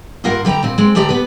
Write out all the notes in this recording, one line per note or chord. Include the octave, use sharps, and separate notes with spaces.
G2 G3 F4 A#4 F#5
D3 G3 G4 G5 A#5
A#2 C4
G#3 C4
D2 A3 G4 D5 A#5
B3 B4